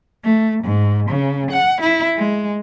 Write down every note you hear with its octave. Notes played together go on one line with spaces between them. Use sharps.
A3
G#2
C#3
F#5
E4
G#3